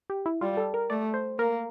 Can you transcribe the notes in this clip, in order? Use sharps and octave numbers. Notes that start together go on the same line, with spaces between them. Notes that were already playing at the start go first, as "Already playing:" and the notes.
G4
E4
G3 F4
A4
A#4
A3 D5
C5
A#3 A#4